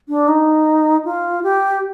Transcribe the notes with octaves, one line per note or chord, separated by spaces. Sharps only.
D4
D#4
F4
G4